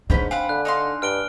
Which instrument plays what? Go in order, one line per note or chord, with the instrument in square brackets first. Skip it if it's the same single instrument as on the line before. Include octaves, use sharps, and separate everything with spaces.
[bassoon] G#2 [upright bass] A#3 D4 [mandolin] C#4 B4 G6
[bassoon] C4 [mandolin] F5 F#5 B5 [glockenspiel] G#5
[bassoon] D3 [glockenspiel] F#6
[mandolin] D#4 F5 C6
[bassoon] G2 [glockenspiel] F6 D7 G7